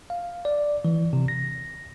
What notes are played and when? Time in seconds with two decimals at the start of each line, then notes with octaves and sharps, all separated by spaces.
0.10 F5
0.45 D5
0.85 E3
1.13 C3
1.28 A#6